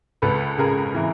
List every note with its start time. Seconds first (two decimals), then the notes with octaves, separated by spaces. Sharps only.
0.22 C#2 A4 B4
0.58 C#3 G#4 A#4
0.95 E3